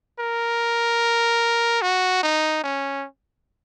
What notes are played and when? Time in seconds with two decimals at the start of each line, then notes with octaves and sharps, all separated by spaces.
0.19 A#4
1.82 F#4
2.23 D#4
2.64 C#4